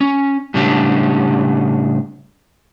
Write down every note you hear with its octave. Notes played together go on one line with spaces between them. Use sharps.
C#4
A2 C#3 G3 C#4 D4 G4